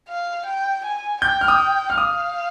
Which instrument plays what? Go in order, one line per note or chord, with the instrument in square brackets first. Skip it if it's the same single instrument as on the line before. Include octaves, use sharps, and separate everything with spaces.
[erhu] F5
G5
G#5
[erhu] G5 [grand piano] G6
[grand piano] F6
D#6
F6
[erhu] F5 [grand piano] D#6